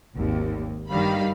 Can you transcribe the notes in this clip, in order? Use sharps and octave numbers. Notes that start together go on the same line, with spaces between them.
G#1 D#2
G2 D#3 G3 F5 B5